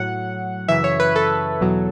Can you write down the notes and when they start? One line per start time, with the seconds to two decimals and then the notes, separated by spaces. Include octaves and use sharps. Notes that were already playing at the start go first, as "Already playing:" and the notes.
Already playing: A2 F#3 F#5
0.68 F#2 C#3 E3 E5
0.84 C#5
1.00 B4
1.16 A4
1.61 E2 B2 F#3